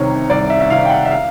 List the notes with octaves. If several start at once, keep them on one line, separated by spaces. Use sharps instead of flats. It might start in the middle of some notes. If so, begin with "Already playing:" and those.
Already playing: C2 C3 D#3 C#5
C2 D5
E5
E5
C3 D#3 F5
G5
F#5
E5
F5